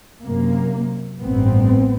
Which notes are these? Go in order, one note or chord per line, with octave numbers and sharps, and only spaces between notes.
F#2 C3 A#3
A1 G2 B3 C4